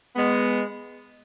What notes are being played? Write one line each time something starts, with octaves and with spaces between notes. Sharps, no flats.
G#3 B3